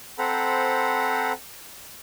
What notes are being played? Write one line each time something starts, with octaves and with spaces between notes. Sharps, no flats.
C4 A4 C5 F#5 A#5 B5